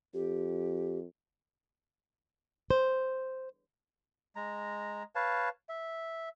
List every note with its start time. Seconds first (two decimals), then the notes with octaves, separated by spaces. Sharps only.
0.14 F2 G4
2.70 C5
4.36 G#3 A#5
5.15 B4 C#5 F5 A5
5.69 E5